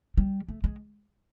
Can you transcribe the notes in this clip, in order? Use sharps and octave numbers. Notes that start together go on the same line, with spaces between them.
G3
A3
G#3